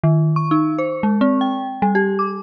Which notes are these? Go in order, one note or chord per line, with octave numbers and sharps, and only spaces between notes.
D#3
C#6
D#4
C5
G#3
C4
G5
G3
G4
D6